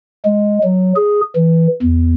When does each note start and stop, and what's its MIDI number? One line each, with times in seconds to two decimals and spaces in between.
0.25 0.59 56
0.63 0.93 54
0.96 1.21 68
1.36 1.67 52
1.82 2.14 40